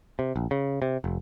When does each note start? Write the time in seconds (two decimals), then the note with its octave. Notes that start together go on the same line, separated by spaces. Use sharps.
0.19 C3
0.36 A#1
0.51 C#3
0.82 C3
1.04 F1